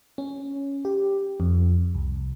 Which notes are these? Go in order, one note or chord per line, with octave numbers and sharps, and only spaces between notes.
C#4
G4
F2
C2